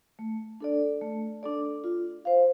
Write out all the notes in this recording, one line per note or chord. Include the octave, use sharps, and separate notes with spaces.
A3
D4 A4 D5
A3
D4 A4 D5
F4
C5 F5